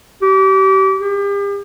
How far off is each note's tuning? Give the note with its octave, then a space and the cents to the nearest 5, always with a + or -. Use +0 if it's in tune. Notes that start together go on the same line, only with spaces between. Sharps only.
G4 -30
G4 +40